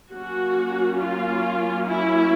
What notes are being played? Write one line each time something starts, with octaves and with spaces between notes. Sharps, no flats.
F#3 A#3 C#4 F#4
F4
E4